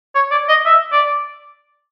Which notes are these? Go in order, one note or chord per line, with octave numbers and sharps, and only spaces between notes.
C#5
D5
D#5
E5
D5